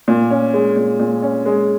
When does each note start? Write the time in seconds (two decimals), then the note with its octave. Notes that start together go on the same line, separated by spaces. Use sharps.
0.08 A#2
0.30 C#4
0.54 G#3
0.76 A#2
0.99 A#2
1.22 C#4
1.46 G#3